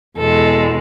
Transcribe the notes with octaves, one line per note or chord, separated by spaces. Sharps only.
E2 B2 G#3 A4